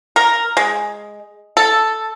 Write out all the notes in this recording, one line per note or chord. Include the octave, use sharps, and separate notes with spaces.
A#4
G#3
A4